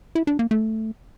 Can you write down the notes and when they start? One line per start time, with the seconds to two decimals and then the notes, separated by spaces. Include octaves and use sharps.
0.15 E4
0.27 D4
0.39 A#3
0.51 A3